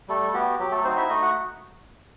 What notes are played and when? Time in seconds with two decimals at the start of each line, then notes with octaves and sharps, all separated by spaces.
0.08 G3 A3 A4
0.34 B3 F#4 G4
0.59 F#3 G4
0.71 A3 A4
0.84 C4 D#4 F#4 C5
0.97 E4 E5
1.09 A3 D#4 D#5
1.22 F#4 F#5